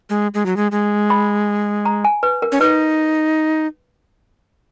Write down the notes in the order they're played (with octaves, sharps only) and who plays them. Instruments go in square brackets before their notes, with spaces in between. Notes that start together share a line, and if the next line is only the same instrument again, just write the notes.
[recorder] G#3
G#3
F#3
G#3
G#3
[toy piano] B5
A#5
G#5
B4
A#4
[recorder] C#4
[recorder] D#4 [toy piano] B4